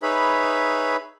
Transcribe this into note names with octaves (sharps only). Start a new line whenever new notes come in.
D#4 G#4 B4 C#5 E5 B5